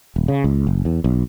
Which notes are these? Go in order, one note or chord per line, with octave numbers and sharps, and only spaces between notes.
D#1
C#3
C#2
F#1
E2
B1